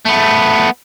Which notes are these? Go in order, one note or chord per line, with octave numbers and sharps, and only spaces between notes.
A3 B3